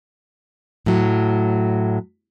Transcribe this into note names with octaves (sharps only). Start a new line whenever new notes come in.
A2 F#3